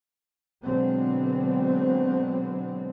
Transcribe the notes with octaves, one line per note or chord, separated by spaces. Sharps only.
B2 D3 F#3 G#3 B3 C4